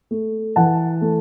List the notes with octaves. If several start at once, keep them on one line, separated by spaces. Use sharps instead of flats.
A3
E3 F#5 A5
A3